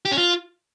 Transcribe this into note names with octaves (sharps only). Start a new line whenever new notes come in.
G4
C#4
F4